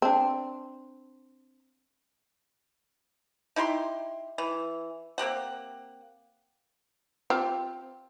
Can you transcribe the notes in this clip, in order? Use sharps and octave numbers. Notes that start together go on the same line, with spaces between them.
C4 D4
D#4 E4 G4 C6
E3
A#3 C4 G4 F#5
C4 F4 G4